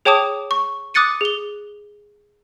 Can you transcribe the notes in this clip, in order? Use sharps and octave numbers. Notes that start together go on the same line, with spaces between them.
G#4 C#5 G5 A5 D6 D#6
C#6
D6 D#6 F#6 A6 C#7 D#7
G#4 G7